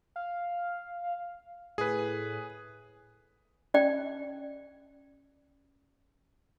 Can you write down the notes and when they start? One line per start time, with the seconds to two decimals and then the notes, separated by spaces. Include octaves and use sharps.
0.16 F5
1.78 A2 G#4 B4
3.74 C#4 D5 G5